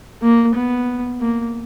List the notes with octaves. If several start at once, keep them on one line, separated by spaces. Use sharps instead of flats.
A#3
B3
A#3